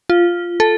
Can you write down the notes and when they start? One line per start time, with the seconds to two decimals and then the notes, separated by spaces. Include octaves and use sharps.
0.10 F4
0.60 A4